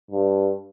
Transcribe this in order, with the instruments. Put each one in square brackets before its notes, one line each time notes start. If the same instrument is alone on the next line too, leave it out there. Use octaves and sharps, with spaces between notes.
[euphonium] G2